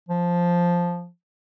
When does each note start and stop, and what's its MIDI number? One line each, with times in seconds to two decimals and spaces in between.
0.09 1.08 53